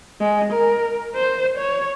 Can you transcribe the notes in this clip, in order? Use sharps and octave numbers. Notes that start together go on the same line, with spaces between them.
G#3
A#4
C5
C#5